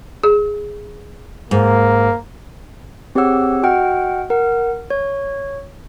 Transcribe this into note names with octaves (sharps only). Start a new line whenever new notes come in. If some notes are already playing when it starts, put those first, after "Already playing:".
G#4
G#2 A#3
C4 G4 G#4 C#5 F#5 E6
F#4 D#5 F#5 G5 F6
A#4 F#5
C#5